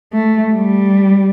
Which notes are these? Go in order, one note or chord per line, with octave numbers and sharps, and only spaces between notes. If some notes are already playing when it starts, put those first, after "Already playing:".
A3
G3